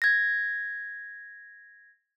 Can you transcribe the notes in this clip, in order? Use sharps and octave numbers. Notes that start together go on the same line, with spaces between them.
G#6 A#6